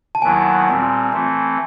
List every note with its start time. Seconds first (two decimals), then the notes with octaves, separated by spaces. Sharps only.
0.15 A5
0.22 D#2 D#3 F#3 B3 E4 G#5
0.68 A#2 G3 C4
1.13 E3 A3 C4